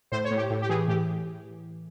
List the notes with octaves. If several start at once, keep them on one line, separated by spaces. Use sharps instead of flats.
A2 C5
C#5
A2
G4
A2
G4
E3 G#4
A2 G4